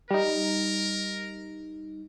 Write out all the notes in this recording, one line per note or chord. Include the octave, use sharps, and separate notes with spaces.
G3 D#4 A#4